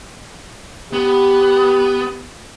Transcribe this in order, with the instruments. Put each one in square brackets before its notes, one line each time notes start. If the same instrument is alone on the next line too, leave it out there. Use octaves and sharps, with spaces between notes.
[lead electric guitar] B3 [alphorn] G4